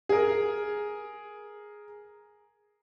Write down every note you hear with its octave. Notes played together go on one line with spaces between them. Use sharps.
G#4 A#4